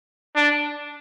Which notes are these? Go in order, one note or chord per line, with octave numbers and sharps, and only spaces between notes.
D4